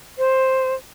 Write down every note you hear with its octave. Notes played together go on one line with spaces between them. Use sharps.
C5